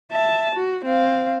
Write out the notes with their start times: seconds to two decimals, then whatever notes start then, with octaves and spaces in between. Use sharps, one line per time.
0.12 E5 A5
0.55 F#4
0.85 C4 F5